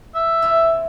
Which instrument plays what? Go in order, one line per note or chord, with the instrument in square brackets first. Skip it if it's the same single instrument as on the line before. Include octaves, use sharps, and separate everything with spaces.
[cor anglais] E5
[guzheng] C3 E4 F4